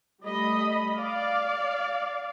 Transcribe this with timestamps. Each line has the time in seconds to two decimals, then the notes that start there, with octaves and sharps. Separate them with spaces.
0.24 G3 A3 D#5 B5
0.98 D5 F5